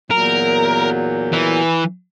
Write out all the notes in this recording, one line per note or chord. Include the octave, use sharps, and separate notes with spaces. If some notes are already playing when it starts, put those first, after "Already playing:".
E2 A#2 F#3 A#4
E3